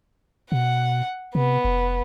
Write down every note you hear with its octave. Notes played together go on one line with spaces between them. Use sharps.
B2 F#5
C3 B3
F1